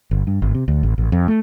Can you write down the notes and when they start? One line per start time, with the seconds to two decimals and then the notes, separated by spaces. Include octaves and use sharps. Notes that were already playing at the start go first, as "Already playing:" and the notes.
0.11 G1
0.27 G2
0.42 G#1
0.55 C3
0.68 D2
0.83 A1
0.98 A1
1.12 F2
1.28 A3